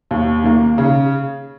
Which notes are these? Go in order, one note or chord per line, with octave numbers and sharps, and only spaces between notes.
D#2
D#3 A#3
C#3